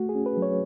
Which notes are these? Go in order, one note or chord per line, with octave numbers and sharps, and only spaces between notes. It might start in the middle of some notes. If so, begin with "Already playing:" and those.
Already playing: A3 F#4
G#4
C#4
B4
F#3
C#5